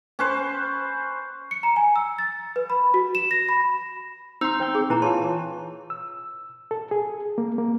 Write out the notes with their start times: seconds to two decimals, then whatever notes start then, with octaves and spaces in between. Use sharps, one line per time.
0.19 C#4 B4 C5
1.51 C#7
1.63 A#5
1.76 G#5
1.96 E6
2.19 A6
2.56 B4
2.70 B5
2.94 F#4
3.15 E7
3.31 A#6
3.49 B5
4.41 C4 D#4 C6 E6
4.60 C4 G5 G6
4.75 G#4
4.90 A#2 E3 E4 A#5
5.02 F4 C#5 A5 C6
5.90 E6
6.71 A4
6.91 G#4
7.38 A#3
7.58 A#3